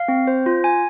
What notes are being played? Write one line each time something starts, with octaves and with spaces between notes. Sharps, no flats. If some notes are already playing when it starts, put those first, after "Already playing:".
Already playing: F5
C4
C5
F4
G#5